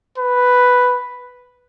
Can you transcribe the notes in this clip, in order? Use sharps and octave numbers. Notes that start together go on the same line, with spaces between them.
B4